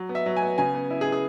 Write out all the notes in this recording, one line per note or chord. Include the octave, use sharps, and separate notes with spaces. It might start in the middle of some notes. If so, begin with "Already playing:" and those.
Already playing: F#3
B3
E5
F#3
G#5
B3
C#3 G#5
B3
E4
G#4
E4
G#4